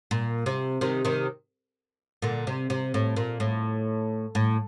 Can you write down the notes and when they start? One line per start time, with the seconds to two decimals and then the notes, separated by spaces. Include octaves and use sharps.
0.11 A#2
0.46 C3
0.81 C3 D#3
1.05 C3 D#3
2.22 A#2 D3
2.47 C3
2.70 C3
2.94 A2
3.16 A#2
3.40 A2
4.35 A2